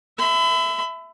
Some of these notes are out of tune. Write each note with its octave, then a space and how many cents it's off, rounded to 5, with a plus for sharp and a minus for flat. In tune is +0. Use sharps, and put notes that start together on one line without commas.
E5 +0 B5 +35